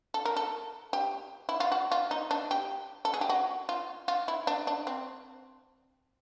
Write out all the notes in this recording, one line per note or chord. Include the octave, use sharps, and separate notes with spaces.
A4
A#4
A4
G4
E4
F4
F#4
F4
D#4
D4
G4
A4
G#4
G4
F#4
F4
F4
E4
D4
D4
C4